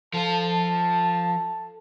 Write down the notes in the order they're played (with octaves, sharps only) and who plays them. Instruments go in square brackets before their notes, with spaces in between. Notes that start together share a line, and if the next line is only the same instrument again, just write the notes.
[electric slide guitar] F3 F4 [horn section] A4 A5